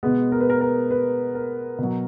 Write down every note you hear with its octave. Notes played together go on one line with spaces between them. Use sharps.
B2 G#3 B3
A#4
B4
A#4
A#4
B4
A#4
B2 F#3